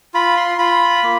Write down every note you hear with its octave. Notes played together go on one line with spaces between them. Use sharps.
F4 B5
C6
F4 B5
A#3